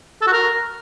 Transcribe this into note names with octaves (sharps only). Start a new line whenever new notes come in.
A4
F#4
A#4